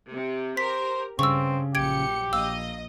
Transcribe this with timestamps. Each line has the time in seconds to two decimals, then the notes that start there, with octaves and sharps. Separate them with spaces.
0.13 C3
0.57 G4 A#4 C5 B6
1.19 G2 C#3 C4 C#6 E6
1.75 A#1 F#3 G4 G#6 C#7 D7
2.33 A#1 D#5 F5 E6